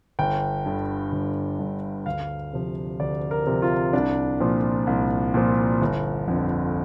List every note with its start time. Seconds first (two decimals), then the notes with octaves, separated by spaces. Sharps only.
0.19 G1 G5
0.66 G2 D3
1.12 G1
1.59 G2 D3
2.06 D2 F5
2.53 C3 F3
3.00 D2 D5
3.31 A#4
3.47 C3 F3
3.62 F4
3.93 C2 D4
4.40 A#2 F3
4.87 C2
5.34 A#2 F3
5.81 G1
6.28 F2 D3